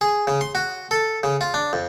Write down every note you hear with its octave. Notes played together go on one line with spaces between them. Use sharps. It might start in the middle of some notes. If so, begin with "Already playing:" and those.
G#4
C#3
C6
F#4
A4
C#3
F4
D4
F2